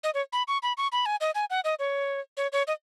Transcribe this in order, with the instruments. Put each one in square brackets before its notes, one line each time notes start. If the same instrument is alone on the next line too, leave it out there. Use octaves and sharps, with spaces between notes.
[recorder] D#5
C#5
B5
C#6
B5
C#6
B5
G#5
D#5
G#5
F#5
D#5
C#5
C#5
C#5
D#5